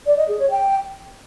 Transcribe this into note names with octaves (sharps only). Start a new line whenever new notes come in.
D5
D#5
G#4
C#5
G5